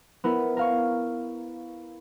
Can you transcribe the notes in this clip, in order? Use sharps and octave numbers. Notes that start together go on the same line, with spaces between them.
B3 E4 A#4
A#4 F5 C#6